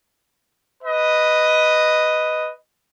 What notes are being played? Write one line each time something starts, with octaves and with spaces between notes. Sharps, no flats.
B4 D#5